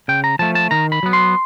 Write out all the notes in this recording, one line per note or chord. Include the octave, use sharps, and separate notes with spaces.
C#3 G5
A#5
F3 A3 A5
A5
D#3 A#5
B5
F#3 B3
C6